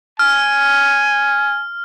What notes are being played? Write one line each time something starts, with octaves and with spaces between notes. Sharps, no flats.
G#5 F6